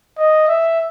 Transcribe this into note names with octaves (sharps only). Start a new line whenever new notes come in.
D#5
E5